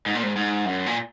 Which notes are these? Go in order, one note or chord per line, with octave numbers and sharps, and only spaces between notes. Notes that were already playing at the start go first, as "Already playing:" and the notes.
G#2
A#2
G#2
G#2
F#2
A#2